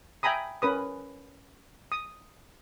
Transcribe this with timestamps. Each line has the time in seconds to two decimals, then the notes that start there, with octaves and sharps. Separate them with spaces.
0.23 E5 G5 G#5 A#5 B5 D#6
0.62 C#4 A#4 B4 D#6
1.92 D#6